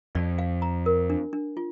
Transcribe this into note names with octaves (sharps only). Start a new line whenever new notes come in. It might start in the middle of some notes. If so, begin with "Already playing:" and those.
F2 D5
F5
A#5
A#4
D4
D4
F4